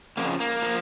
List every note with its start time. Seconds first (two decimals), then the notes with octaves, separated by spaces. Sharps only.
0.17 F2 C#3 F3 A#3
0.40 A#3
0.63 F3